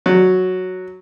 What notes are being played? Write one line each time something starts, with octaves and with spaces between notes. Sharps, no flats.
F#3